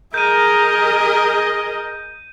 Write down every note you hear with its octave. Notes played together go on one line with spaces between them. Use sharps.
G#4 A#4 D#5 G6 D#7